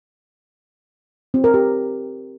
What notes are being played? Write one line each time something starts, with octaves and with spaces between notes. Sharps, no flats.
C4
A#4
G4